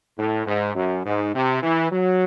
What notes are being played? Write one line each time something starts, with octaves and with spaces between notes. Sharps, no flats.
A2
G#2
F#2
G#2
C3
E3
F#3